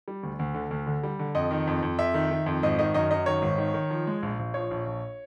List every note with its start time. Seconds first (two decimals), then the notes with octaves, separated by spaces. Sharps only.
0.08 G3
0.23 D2
0.39 D2
0.54 D3
0.71 D2
0.87 D3
1.04 G3
1.19 D3
1.35 F2 D#5
1.51 D#3
1.67 F2
1.82 F2
1.99 F2 E5
2.14 D#3
2.31 D#3
2.46 F2
2.63 G#1 D#5
2.79 D#3 D#5
2.94 F#2 D#5
3.11 F#2 D#5
3.26 D#3 C#5
3.42 G#1
3.58 D#3
3.74 D#3
3.91 F3
4.07 G#3
4.22 A#1
4.39 A#1
4.54 F3 C#5
4.71 A#1
4.86 A#1